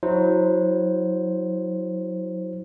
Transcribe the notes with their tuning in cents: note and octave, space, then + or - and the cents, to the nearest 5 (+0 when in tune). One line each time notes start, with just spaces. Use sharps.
F#3 -15 E4 -35 C5 +0